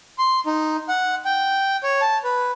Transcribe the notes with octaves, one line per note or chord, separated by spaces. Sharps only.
C6
D#4
F#5
G5
C#5
A5
B4